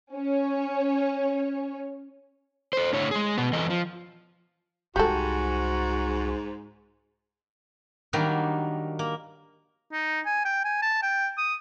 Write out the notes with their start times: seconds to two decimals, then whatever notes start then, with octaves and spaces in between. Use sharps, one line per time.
0.14 C#4 C#5
2.73 A4 C5
2.93 A2 D3 E4 C#5
3.11 G#3 G#4
3.38 B2 B3
3.53 E2 E3 A4 D#5
3.70 F3
4.96 C2 G#2 G#3 F#4 G4 A4
8.13 D#3 F#3 G3 A#3 D4 D#4
8.99 A#3
9.92 D#4
10.26 G#5
10.45 G5
10.65 G#5
10.82 A5
11.03 G5
11.38 D#6